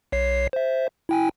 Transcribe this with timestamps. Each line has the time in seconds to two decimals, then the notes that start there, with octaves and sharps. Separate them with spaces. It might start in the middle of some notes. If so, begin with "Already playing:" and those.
0.12 B1 C#5 C7
0.53 C5 E5
1.09 E4 G5 G#5